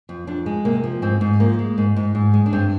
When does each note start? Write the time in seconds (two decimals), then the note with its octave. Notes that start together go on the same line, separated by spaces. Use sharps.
0.09 F2
0.27 F2 D4
0.46 G#3
0.65 C3 A#3
0.84 F3
1.02 G#2 C4
1.21 G#2
1.40 F3 A#3
1.59 G#3
1.78 G#2
1.96 G#2
2.15 G#2
2.34 G#3
2.46 D4
2.53 G2 C4